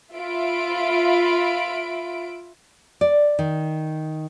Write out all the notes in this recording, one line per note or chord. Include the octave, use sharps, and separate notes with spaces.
F4 E5 B5 D7
D5
D#3